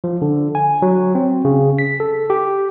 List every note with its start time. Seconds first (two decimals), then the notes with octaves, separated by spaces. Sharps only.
0.04 F3
0.22 D3
0.55 G#5
0.82 F#3
1.15 C4
1.45 C#3
1.79 B6
2.00 A4
2.30 G4